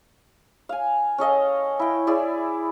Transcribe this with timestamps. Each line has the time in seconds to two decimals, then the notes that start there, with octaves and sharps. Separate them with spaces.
0.69 F5 G#5
1.18 C#4 A4 D#5 F5
1.80 E4 G5
2.07 E4 G#4 D5